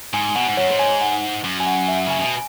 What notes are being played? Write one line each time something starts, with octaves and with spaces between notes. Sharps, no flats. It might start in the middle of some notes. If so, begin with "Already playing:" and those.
G#2 G#5
B2 F#5
G#2
F#2 C#5
G#2
G#5
F#5
F#2
G#5
F#5
E5
C#3 G#5
B2
G#5